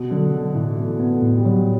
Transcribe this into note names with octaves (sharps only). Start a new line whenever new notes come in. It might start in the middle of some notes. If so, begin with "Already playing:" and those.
Already playing: B2
D3 F#3
D3 F#3
A2 E3
A3 B3
B3
A3
A2
G3
F#3